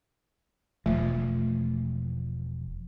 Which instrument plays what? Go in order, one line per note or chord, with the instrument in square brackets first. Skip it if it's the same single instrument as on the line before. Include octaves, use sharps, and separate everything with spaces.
[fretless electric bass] E1 F3 [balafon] A3